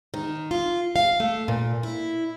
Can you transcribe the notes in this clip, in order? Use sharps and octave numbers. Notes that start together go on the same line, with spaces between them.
D#3
F4
F5
A3
A#2
E4